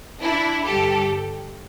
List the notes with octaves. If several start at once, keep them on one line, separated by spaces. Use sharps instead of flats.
D4 E4
G2 D3 G4 A4